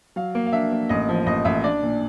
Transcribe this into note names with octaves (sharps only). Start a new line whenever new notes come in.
F#3 F5
A#3
F5
D4 E5
A#3
A1 D#5
F3
A1 D#5
A1 E5
D4 D5
A#2